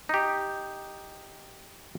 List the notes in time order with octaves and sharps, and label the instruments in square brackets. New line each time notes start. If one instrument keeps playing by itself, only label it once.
[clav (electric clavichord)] D#4 G4